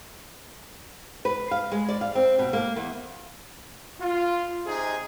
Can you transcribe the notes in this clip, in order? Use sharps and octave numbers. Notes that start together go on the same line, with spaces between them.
B4
F5
G#3
D5
F5
C4
B2
A#3
E2
F4
C3 C4 D#4 G#4